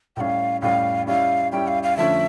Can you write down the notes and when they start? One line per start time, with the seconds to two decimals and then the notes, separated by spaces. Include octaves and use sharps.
0.16 A2 G3 C#4 F5 G5
0.62 A2 G3 C#4 F5
1.07 G3 C#4 E4 G4 F5
1.52 G3 C#4 E4 G4 G5
1.68 F5
1.83 F5
1.97 D3 F3 A3 C#4 E5